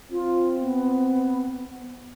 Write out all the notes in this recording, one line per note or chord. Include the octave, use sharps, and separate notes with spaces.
C4 F4
B3